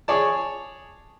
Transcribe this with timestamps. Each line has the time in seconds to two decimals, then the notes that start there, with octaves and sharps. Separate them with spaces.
0.08 G#4 C#5 D5 A5